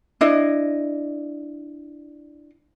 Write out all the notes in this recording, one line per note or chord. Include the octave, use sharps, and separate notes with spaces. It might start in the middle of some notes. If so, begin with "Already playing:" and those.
D4 E4 D#5